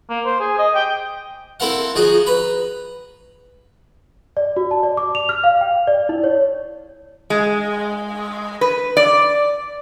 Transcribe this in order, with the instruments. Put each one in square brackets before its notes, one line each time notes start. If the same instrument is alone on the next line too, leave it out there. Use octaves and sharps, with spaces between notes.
[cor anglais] A#3
C5
G#4
D#5
G5
[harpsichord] C4 E4 A4 A#4 F5 F#5
F3 D#4 F#4 G#4 D#5
B4 A#5 B5
[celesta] D5
F#4
A5
D5
D6
F7
F6
F5
G5
D5
E4
C#5
[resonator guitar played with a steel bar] G#3
B4
D5